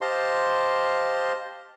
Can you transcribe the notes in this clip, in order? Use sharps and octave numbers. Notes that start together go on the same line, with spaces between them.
G4 C5 D#5 F5 A5 C6